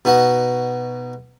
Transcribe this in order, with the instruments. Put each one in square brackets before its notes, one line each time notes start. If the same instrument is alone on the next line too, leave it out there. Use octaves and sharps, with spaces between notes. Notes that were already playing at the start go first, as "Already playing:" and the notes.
[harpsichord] B2 D#4 F#4 D#5